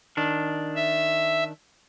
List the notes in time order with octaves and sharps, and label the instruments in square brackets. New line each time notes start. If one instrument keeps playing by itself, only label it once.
[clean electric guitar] D#3 D4
[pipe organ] E5